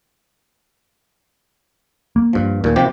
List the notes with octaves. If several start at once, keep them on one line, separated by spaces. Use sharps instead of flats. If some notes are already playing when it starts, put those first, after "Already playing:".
A#3
G2 F3
D#2 A#2
C3 F3 G4